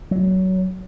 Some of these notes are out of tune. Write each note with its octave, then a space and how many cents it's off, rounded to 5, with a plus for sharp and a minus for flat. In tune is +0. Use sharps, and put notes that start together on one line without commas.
F#3 +20